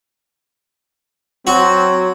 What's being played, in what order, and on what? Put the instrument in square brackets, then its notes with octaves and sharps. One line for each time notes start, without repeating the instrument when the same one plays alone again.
[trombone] F#3 [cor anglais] C4 [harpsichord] F#4